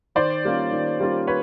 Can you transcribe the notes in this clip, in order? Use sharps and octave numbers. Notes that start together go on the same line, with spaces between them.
D#3 C5 D5
G3 A#3 C#4 F4
D#3
G3 A#3 C#4 F4
B4 C#5